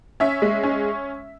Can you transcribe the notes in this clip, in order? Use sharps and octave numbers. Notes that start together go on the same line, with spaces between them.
C#4 E5
G#3
C#4